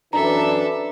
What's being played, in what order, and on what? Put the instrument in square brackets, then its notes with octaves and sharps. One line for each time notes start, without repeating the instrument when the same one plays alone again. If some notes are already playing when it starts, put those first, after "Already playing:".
[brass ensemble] F#2 E3 D4 [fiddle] A4 E5 [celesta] A#5